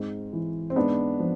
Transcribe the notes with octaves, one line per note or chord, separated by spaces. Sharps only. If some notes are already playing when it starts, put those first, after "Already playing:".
Already playing: G#2 C4
E3
C4
G#2 B3 D4
F3